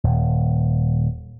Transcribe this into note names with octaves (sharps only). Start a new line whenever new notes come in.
D#1